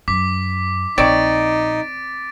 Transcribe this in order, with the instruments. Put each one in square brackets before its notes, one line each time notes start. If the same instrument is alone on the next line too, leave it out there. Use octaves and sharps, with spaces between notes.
[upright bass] F#2 [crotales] D6 B6
[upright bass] A#1 [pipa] C4 C#5 D5 [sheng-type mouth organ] D#4 [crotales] A6 D7